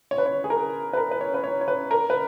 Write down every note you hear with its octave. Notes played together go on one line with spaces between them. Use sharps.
C#5
B4
C#5
G#4
A#4
B4
A#4
B4
C#5
B4
C#5
C#5
B4
A#4
B4